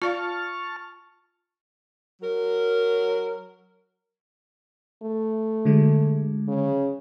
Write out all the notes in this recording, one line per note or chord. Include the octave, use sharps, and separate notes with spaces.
F4 D5 F5 A5 C#6 F6
F#3 A#4
A3
D3 F#3 G#3
C#3